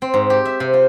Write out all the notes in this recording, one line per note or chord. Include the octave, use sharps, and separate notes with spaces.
C4
G#2
G4
E5
C3
F4